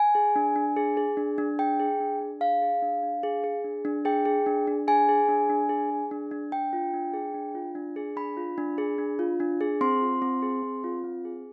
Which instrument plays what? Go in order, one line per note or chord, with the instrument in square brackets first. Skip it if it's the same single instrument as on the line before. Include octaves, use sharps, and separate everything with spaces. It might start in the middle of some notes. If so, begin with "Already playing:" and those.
Already playing: [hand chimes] G#5
G#4
D4
D4
G#4
G#4
D4
D4
G#4 G5
G#4
D4
D4
G#4 F5
G#4
D4
D4
G#4
G#4
D4
D4
G#4 G5
G#4
D4
D4
G#4 G#5
G#4
D4
D4
G#4
G#4
D4
D4
D4 G5
F4
D4
G#4
D4
F4
D4
G#4
D4 B5
F4
D4
G#4
D4
F4
D4
G#4
C4 C6
F4
C4
G#4
C4
F4
C4
G#4